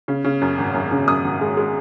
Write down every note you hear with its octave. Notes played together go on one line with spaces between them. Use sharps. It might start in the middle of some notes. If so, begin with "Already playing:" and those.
C#3
C#3
F#2
G#1
F#2
C#3
F#2 D#6
G#1
G#3
G#3